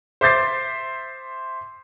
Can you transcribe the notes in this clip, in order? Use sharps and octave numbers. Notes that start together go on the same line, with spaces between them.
C5 E5 D6 G6 A6 C7